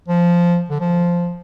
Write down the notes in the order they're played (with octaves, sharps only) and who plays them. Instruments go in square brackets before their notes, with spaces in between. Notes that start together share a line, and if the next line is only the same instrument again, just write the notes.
[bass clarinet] F3
D3
F3